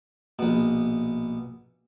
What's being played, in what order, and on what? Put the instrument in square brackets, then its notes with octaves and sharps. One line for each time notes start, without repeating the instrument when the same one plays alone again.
[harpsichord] A#1 B2